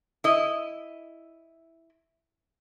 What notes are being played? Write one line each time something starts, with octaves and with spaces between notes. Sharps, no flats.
E4 D#5